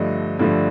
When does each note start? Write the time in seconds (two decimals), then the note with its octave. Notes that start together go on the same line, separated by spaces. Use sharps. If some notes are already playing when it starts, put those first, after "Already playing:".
Already playing: G2 D3 F3 A3 D#5
0.39 G2 D3 F3 A3